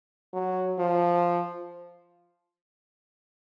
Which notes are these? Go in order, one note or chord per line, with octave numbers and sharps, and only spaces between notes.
F#3
F3